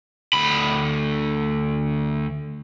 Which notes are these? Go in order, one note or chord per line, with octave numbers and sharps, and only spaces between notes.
D2 B5